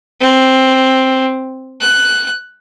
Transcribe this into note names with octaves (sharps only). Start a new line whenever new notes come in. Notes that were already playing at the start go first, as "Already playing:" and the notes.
C4
F#6